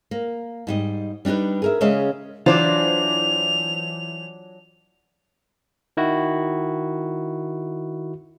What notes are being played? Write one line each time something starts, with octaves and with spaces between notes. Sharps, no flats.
A#3
G#2 G3 D#5
G3 D4 D#4 G4 B4
G#4 A#4 E5
C#3 G#3 C#4 C#5 D#5 E5
E3 F#3 D4 F4 C5 F7
D#3 E4 F#4